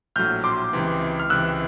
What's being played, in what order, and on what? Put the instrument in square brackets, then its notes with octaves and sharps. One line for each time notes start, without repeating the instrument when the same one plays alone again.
[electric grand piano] A#1 A2 F#3 F6 G6
C6 D6
C#2 C3 E3
F6
C#2 C3 E3 E6 F#6